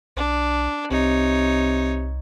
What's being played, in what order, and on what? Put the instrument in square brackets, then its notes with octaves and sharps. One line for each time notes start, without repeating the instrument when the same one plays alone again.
[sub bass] B1 [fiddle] D4
[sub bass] C2 [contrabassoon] C3 [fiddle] D#4 C#5